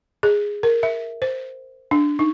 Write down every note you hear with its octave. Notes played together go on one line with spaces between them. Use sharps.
G#4
A#4
E5
C5
D4
D#4